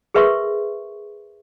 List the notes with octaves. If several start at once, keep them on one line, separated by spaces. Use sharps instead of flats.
G#4 A#4 B4 E5 C6 C#6